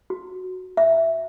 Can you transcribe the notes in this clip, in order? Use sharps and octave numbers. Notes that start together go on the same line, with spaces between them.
F#4
E5